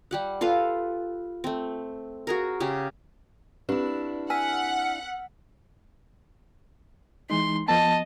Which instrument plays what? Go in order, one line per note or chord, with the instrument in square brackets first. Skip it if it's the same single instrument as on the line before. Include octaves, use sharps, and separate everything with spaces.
[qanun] G3 G4 F#5
F4 A4 B4 F5
A3 C4
F#4 G#4 A#4
C#3 G4 G#4
[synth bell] C4 G4 B4 [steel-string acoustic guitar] D4 E4
[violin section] F#5 [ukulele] G#5 [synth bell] E6 F6 B6
[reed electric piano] E3 G#3 D#4 [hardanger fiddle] C6
[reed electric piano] F3 B3 [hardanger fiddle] D#5 [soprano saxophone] A5